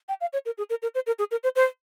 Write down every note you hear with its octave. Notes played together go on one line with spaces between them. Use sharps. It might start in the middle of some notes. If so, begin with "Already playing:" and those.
G5
F5
C#5
A#4
G#4
A#4
A#4
C5
A#4
G#4
A#4
C5
C5